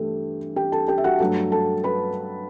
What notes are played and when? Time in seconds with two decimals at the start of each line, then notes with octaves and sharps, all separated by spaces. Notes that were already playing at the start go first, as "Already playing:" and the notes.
Already playing: G2 E3 A3 G4 A4
0.56 G4 G5
0.72 A4 A5
0.88 G4 G5
0.98 E5
1.04 F#4 F#5
1.20 G2 F#3 A3
1.52 A4 A5
1.84 B4 B5